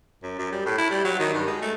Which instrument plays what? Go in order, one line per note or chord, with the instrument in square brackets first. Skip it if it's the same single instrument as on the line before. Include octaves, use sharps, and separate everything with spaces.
[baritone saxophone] F#2
F#2
G3
A2
E4
G3
F#3
D#3
G2
G#3
A3